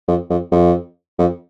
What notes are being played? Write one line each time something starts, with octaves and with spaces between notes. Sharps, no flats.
F2
F2
F2
F2